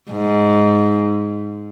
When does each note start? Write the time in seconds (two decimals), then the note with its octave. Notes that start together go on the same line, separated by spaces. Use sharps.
0.11 G#2